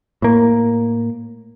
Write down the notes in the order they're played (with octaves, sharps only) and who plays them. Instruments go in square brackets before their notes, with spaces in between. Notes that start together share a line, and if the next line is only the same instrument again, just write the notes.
[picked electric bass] A2 A#3